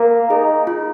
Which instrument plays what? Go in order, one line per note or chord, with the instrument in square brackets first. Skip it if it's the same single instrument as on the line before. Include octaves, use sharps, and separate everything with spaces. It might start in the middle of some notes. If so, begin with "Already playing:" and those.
Already playing: [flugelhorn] A#3 [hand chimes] A#4
[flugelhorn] D#4 [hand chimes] G#4
[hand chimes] F4